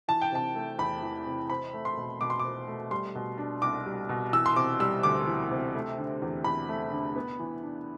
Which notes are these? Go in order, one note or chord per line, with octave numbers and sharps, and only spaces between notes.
E3 A5
G5
C3 A5
A3
E2 B5
E3
C3
C4 B5
A3
C6
B2
B2 D6
C6
C4 D6
A3
G3 C6
B2
D4
C2 D6
G3
B2
E3 E6
C6
C3 D6
G3 E6
D2 D6
E3
C3
A3
D3
E2
E2 B5
A3
D3
B3
E3
D4